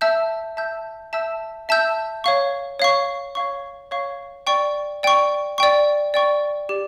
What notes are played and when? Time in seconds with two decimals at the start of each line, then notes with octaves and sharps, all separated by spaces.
0.01 E5 A5 E6 G6
0.57 E5 A5 E6 G6
1.13 E5 A5 E6 G6
1.69 E5 A5 E6 G6
2.24 C#5 F5 C#6
2.79 C#5 F5 C#6
3.35 C#5 F5 C#6
3.91 C#5 F5 C#6
4.47 D5 G5 C#6
5.03 D5 G5 C#6
5.58 D5 G5 C#6
6.14 D5 G5 C#6
6.69 G4 D5